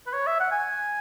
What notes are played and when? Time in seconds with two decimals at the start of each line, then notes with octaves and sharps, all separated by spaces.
0.07 B4
0.14 C#5
0.27 E5
0.40 F#5
0.52 G#5